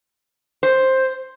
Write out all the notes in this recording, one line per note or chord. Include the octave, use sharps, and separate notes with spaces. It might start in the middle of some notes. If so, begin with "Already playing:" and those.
C5